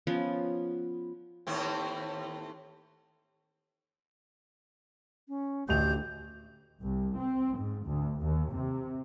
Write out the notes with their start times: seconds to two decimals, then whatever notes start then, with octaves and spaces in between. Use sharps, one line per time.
0.07 F3 B3 C#4
1.47 D#2 A2 C4
5.28 C#4
5.69 A1 D2 G4 D#5 G6 F7
6.83 C2
7.18 C4
7.58 G#2
7.88 D2
8.22 D#2
8.56 C3